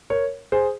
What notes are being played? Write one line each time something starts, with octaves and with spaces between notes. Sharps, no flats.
A#4 C#5
G#4 C5